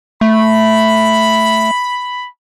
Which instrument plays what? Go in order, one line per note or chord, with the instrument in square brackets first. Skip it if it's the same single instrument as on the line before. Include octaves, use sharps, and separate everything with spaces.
[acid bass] A3 [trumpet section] B5